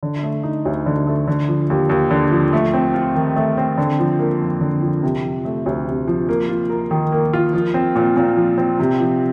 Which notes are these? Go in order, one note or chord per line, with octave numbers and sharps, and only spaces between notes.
D3
A3
D#4
D2
D3
A3
D3
F3
D#2
D#2
D3
F3
A3
C4
F4
D#3
A3
C4
D3
F3
A#3
F2
D3
F3
C3
F3
A3
D2
C3
F3
A#3
F4
A#4
D#3
A#3
F4
F3
C4
A#2
A#2
F3
C4
C3
F3